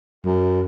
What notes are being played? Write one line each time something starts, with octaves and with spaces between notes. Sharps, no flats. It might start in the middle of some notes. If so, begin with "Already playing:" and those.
F#2